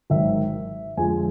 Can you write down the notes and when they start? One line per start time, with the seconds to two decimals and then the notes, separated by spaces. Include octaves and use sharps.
0.10 G#1 G#2 D#3 F#3 E5
0.97 F2 D3 F3 G#3 G#5